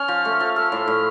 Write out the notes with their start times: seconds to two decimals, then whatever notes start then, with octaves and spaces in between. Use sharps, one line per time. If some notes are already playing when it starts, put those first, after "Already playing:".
Already playing: C#4 F6
0.08 F3
0.25 A3
0.40 F3
0.56 A4 F6
0.72 A2
0.88 A2